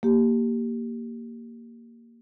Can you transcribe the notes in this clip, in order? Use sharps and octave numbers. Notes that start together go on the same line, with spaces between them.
A#3 G4